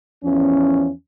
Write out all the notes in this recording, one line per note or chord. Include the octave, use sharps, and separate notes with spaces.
E2 F3 C#4